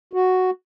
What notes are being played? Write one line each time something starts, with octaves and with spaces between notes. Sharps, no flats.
F#4